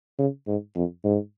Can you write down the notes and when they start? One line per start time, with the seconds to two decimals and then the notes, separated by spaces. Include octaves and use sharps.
0.19 C#3
0.47 G#2
0.76 F2
1.04 G#2